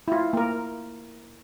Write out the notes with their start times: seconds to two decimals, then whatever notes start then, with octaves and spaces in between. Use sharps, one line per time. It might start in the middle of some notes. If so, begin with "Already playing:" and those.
0.08 E4 F4
0.33 A#3 A#4